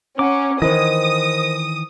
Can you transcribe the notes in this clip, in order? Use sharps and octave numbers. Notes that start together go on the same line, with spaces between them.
C#4 F#5 A#5 D6
D#3 E3 A#4 C5 D#5 D#6